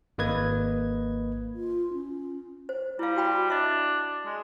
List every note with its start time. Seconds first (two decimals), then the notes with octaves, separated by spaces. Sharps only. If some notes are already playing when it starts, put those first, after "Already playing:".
0.18 G#1 A#3 B4 D#5 G#6
1.54 F4
1.94 C#4
2.69 C5
2.99 G3 E4 F5
3.17 F#4 G5 B5
3.50 D4 D#5 E5
4.25 G#3